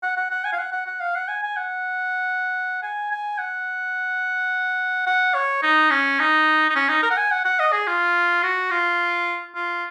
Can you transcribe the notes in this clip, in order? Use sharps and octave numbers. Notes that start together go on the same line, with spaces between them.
F#5
F#5
F#5
G#5
F5
F#5
F#5
F#5
F5
F#5
G#5
G#5
F#5
G#5
G#5
F#5
F#5
C#5
D#4
C#4
D#4
D#4
C#4
D#4
A#4
F#5
G#5
F#5
F#5
D#5
G#4
F4
F#4
F4
F4